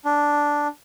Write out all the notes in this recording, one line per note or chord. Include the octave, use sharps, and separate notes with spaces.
D4